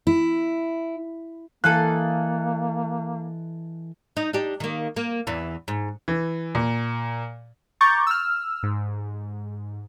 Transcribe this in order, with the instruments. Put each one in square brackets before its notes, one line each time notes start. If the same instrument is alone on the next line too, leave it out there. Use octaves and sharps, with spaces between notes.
[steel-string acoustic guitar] E4
[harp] E3 [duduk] A#3 [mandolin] A4 D#5 F5 [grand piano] F#6
[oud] D#4
D4 D#4 G4
D#3 A#3
A#3
E2 E3
G#2
[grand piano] E3
A#2
[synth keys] A#5 C#6 D6 G6 A6
E6 F6
G#2